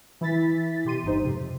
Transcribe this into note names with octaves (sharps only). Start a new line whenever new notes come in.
E3 E4 A6 B6
B2 G4 C6 D#7
G1 G2 D#4 C5
F2 G#2 C3